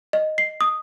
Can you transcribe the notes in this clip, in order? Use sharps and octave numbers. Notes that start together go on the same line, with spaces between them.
D#5
C7
D#6